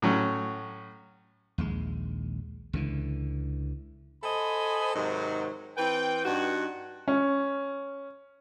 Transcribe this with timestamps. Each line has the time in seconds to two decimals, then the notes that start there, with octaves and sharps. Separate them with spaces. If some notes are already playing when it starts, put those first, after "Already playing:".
0.02 A2 F#3 C#4
1.58 A#1 D#2 G#3
2.73 C#2 D3 E3
4.23 A4 C5 D#5 G#5 B5
4.94 G#2 C3 D#3 F#3
5.78 E3 C4 B4 G5
6.25 G2 D#4 F#4
7.08 C#4